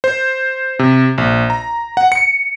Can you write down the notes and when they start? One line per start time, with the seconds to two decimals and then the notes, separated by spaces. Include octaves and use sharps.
0.04 C5
0.79 C3
1.18 A#1
1.50 A#5
1.97 F#5
2.12 C#7